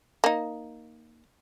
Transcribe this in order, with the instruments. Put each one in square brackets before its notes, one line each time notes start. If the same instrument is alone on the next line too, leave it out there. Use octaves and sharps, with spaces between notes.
[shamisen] A#3 D#4